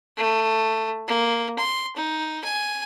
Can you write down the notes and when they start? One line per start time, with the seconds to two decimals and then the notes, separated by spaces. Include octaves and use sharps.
0.17 A3
1.07 A#3
1.59 C6
1.96 D#4
2.44 G#5